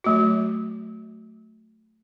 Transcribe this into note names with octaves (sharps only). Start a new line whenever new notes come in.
F#3 A3 F#4